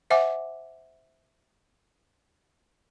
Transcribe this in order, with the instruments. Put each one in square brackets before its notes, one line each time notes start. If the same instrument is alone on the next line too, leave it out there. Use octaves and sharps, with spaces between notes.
[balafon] C5 E5 F#5 G#5 D6